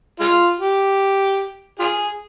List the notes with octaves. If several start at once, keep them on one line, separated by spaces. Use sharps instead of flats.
G#3 F4
G4
F4 G#4